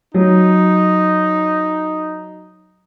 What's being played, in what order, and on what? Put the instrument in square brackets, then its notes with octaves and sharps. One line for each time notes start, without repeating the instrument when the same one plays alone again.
[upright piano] F#3 [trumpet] D#4